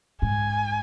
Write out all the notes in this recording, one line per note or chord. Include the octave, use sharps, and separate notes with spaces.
G#2 G#5